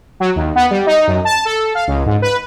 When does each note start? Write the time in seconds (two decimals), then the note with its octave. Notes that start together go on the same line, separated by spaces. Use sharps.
0.20 F#3
0.36 D#2
0.56 B3
0.71 G3
0.87 D#4
1.08 F#2
1.25 A5
1.45 A4
1.75 F5
1.88 C#2
2.06 G#2
2.22 B4